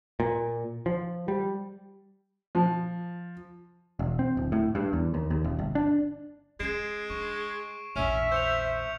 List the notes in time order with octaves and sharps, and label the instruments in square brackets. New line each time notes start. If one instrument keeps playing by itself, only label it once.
[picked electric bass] A#2
F3
G3
[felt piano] F3
[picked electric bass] E1
C4
D1
A2
G2
E2
D#2
D#2
D#1
G1
D4
[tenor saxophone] G#3 [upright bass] C#4 [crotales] C7 D7 E7
[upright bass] D4 [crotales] C#6
[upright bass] A#1 E2 [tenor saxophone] C#4 [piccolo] E5 [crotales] C#6 F6 F7
[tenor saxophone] C5 [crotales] G6 C#7 F7